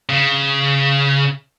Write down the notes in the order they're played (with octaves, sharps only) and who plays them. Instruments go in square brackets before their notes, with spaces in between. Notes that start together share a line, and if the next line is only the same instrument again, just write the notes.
[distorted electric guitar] C#3